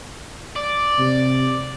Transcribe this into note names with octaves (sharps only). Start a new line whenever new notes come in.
D5
C3